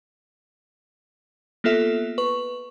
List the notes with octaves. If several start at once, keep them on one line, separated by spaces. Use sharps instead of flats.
A#3 B3 F4 A4 E5
B4 C#6